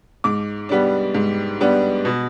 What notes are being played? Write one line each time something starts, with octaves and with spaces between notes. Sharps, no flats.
G#2 D6
G3 B3 D4
G#2
G3 B3 D4
B2